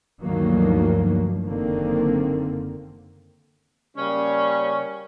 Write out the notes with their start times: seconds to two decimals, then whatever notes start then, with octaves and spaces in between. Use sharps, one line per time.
0.23 D2 G2 D#3 F3 F#3 A#3
1.44 F#1 D3 D#3 A#3 C4
3.97 C#3 G3 A#3 C#4